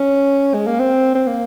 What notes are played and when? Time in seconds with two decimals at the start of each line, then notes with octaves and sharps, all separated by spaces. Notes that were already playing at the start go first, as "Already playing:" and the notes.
Already playing: C#4
0.54 G#3
0.67 A#3
0.80 C4
1.15 C4
1.27 A#3